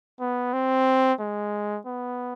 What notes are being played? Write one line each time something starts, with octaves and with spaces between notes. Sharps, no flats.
B3
C4
G#3
B3